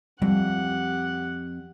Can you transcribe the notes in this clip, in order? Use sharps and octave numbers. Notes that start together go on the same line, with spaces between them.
F2 G3 G4 F#5